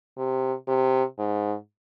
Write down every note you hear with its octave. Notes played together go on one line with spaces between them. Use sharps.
C3
C3
G#2